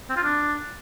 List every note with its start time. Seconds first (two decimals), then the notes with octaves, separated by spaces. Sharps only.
0.09 C4
0.16 F4
0.24 D4